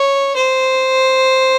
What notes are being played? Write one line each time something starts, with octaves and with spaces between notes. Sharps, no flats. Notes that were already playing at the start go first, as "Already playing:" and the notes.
Already playing: C#5
C5